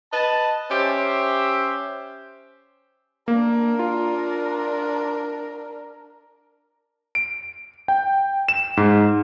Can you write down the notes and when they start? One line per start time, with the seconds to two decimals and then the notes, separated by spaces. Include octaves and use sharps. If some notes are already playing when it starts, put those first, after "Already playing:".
0.13 B4 D#5 A5
0.71 C#4 G4 C5 E5
3.28 A#3 D4 A#4
3.79 F4
7.15 D7
7.88 G5
8.49 E7
8.77 G#2